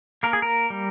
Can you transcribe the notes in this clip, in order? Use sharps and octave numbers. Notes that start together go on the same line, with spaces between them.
A#3 A#4
G#4
A#4
G3